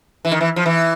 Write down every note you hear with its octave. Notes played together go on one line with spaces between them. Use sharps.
E3
D#3
E3
F3
E3